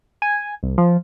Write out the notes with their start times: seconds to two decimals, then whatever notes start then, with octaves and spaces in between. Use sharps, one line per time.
0.22 G#5
0.63 C2
0.78 F3